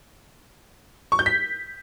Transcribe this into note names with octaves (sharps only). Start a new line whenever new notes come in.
C#6
G6
B6